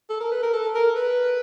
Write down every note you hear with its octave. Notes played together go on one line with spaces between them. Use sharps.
A4
A#4
B4
A#4
A4
A#4
B4